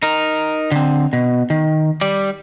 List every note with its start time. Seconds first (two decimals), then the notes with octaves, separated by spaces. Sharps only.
0.03 D#4 A#4
0.72 D3 C4
1.13 B2
1.50 D#3
2.01 G3 D5